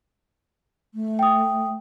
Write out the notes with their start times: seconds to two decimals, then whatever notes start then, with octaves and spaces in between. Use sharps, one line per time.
0.94 A3
1.19 G5 D#6